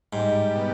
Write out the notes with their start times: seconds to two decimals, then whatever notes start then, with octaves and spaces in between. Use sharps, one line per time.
0.13 G#2 G3
0.55 B2